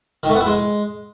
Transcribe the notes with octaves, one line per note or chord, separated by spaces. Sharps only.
D#3
A3
B3
E4
G#3